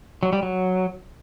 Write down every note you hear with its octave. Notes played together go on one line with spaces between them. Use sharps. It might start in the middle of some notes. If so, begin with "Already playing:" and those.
F#3
G3
F#3